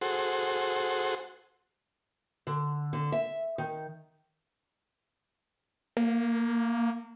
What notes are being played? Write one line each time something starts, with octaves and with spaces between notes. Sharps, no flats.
F#4 G#4 A4 C5 F#5 C6
D3
D3
E5
D#3
A#3